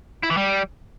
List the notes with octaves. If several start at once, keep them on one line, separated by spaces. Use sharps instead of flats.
E4
E3
G3